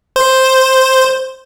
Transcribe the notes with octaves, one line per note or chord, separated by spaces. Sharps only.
C5